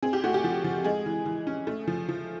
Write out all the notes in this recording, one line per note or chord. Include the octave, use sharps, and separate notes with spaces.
C4 G#4
G4
A3 F#4
G4
F3
F3
G#3 G#4
E3
E3
C#4
A3
F3
F3